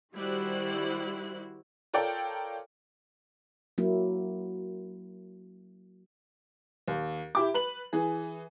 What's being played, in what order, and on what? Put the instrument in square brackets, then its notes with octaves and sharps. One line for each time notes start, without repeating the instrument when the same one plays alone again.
[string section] D#3 G3 E4 F#4 C5 F#6
[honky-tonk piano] F4 A4 A#4 C#5 D5 G5
[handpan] F#3 A#3 E4
[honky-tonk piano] D#2
E4 G4 D6
B4 B5 F#7
E3 G#4